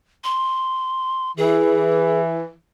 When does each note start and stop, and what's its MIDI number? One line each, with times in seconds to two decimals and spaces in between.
0.24 1.32 84
1.37 2.52 52
1.37 2.21 68